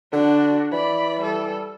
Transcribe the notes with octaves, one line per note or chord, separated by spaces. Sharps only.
D3 D4 F#4
E3 D5 B5
G3 A4